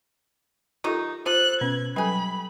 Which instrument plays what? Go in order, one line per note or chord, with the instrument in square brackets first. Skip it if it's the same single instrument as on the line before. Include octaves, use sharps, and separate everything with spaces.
[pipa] D#3 F#3 D#4 [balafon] F4 G4 A4 [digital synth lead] A#5
[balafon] F4 [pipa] A4 [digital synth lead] C5 [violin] F#6
[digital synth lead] B2 [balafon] C#4 [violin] G#6
[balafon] F#3 A4 [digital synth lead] G3 [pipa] B4 G#5 [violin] B5